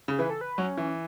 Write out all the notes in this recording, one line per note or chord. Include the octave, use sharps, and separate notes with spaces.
C#3
E3 B4
A4
B4
F#3 C#4
E3